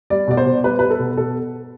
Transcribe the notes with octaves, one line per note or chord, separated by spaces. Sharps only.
G3 D5
B2 D5
C5
B2
G3 B4
G3 B4
A4
B2
B2 A4